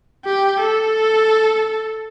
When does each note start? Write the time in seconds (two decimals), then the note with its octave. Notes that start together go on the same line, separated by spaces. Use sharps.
0.25 G4
0.59 A4